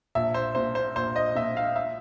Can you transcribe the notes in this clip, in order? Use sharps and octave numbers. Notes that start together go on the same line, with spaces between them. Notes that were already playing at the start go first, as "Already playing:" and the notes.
A#1 E5
C5
A#2 C5
C5
A#1 C5
D#5
A#2 E5
F5
E5